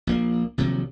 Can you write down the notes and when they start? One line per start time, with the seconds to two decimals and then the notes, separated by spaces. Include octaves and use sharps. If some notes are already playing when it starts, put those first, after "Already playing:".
0.07 A#1 A#3
0.58 A#1 C3 D#3 F#3